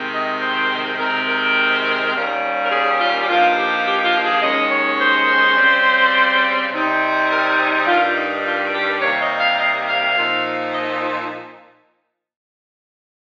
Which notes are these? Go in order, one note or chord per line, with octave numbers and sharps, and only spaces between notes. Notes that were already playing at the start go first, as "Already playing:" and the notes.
Already playing: C3 D#3 G#3 C4
D#5
C5
C3 D#3 G#3 C4 A#4
A#4
D#2 D#3 G3 A#3 C#4
A#4
G#4
F4
G4
G2 F3 A#3 D#4 F4
G4
G4
F4
G#4
D#2 D#3 G#3 C#4 D#5
C#5
C5
C#3 G3 C4
C3 G3 C4 D#4
A#4
G#4
G2 D#3 G3 F4
D#4
F4
G4
C3 G3 A#3 D#4 C#5
D#5
F5
D#5
F5
A#2 F3 C4 D#4
D#5